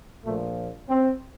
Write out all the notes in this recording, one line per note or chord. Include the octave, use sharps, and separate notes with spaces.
A#1 A#2 F3 A3
C4